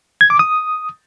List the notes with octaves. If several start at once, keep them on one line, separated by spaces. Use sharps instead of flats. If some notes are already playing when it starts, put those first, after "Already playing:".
G#6
D6
D#6